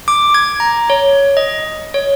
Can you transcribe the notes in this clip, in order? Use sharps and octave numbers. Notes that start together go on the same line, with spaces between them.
D6
G#6
A#5
C#5
D#5
C#5